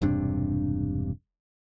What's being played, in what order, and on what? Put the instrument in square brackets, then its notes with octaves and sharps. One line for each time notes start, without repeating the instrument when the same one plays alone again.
[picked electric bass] E1 G2 C3 D4